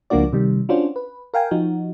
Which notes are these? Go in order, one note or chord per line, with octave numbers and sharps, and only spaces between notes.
C#2 F3 A#3 D4 F#4 D5
C3 D#3 G3
C#4 D4 F4 F#4 C5
B4
A#4 F5 G5 G#5
F3 D#4 F#4